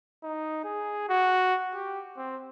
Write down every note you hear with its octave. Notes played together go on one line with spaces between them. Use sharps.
D#4
G#4
F#4
G4
C4